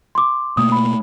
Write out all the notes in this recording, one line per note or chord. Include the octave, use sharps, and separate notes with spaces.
C6 D6
B2 A3 A#3 D#6
B5